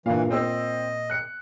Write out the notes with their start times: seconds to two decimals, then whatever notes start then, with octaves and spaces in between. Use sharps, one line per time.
0.06 G2 A#2 E3 F5
0.31 C4 D#5 E6
1.10 F#6 C#7